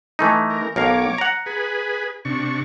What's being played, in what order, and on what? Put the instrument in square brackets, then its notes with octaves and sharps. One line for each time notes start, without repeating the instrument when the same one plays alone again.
[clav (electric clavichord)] E3 A3 D#4
[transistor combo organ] A#4
[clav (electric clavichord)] B1 A#4 F5 [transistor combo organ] C#5 D6
[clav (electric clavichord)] F#5 A#5
[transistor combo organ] G#4 B4
C3 D4 C#6